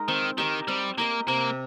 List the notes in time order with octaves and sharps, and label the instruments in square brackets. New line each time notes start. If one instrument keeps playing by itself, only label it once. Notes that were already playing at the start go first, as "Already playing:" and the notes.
Already playing: [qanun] G#3 D#4 A#4
[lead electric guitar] D#3 [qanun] C4
[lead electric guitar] D#3 [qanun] G4 A#4 D#5
[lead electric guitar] G3 [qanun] C4
[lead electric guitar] A#3 [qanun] G4 A#4 D#5
[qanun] C3 [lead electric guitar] A#3